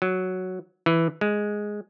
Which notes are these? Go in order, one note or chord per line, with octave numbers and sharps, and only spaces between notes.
F#3
E3
G#3